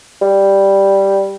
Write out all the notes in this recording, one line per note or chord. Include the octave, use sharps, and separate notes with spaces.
G3